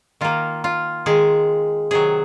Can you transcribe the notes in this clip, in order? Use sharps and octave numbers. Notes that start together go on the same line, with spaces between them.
D#3 A#3 F4
F4
D#3 G#3 G#4
C3 D#3 F#3 G#4